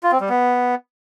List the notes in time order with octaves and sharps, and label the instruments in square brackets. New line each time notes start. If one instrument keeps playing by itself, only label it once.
[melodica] F4
C4
G3
B3